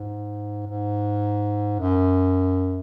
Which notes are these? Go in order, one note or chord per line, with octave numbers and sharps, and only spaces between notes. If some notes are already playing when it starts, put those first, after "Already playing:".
Already playing: G#2
G#2
F#2